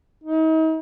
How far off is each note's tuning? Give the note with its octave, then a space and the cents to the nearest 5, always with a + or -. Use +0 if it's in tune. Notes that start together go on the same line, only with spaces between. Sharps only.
D#4 +40